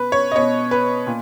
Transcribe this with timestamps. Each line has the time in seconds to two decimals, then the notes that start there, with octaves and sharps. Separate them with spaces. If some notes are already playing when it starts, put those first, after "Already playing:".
Already playing: B2 B4
0.12 C#5
0.32 D#5
0.36 B2 C#5
0.71 B4
1.07 A#2